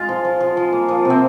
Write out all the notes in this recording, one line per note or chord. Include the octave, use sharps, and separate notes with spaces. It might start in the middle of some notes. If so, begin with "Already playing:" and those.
Already playing: G#3 F4
F3
F3
F3
F3
A#3
F3
C3
C4